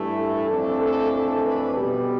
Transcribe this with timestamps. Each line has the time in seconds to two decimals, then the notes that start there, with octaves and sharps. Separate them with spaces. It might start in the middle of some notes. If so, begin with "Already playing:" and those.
Already playing: G2 E3 A3 E4
0.18 A4
0.50 F2 E3 A3 D4
0.82 A4
1.14 A4
1.44 B4
1.76 B2 G3 B3 G4